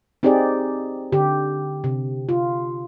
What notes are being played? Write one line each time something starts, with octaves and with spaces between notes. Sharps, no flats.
C4 D#4 G4 G#4 D5
D3 G4
C3
F4